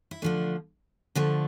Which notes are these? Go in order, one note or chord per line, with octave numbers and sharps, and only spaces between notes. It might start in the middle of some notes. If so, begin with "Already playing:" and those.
E4
D3 F3 A3 D4
D3 F3 A3